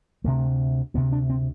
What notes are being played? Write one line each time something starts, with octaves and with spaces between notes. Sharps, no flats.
D2 C3 A3
D2 C3 B3
D4
C4